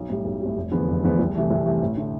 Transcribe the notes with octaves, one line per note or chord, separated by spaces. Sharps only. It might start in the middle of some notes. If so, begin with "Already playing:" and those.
Already playing: B1
A2 G3
B1
A2 G3
F1
E2 D3 F3 B3
F1
E2 D3 F3 B3
C2
C3 E3 A3
C2
C3 E3 A3
A1
D3 A3